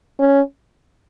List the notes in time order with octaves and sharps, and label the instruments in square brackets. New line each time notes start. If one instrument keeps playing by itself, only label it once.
[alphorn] C#4